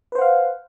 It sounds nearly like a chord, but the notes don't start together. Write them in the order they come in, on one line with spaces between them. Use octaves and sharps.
B4 C5 F#5 F5